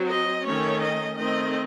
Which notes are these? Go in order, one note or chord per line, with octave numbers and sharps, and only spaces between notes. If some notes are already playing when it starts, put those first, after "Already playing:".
Already playing: F#3 C4
D#5
D#3 A3 C#4 C#5
D#5
D#3 A3 C4 D#5